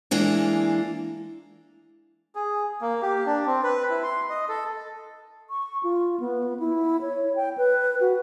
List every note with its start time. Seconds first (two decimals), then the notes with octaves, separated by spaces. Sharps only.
0.11 E3 G#3 A#3 D4
2.35 G#4
2.81 A#3
3.02 G4
3.26 D4
3.46 C4
3.63 B4
3.90 E4
4.03 C6
4.30 D#5
4.49 A4
5.50 C#6
5.83 F4
6.20 B3
6.60 E4
7.01 C#5
7.36 G5
7.58 B4
8.01 F#4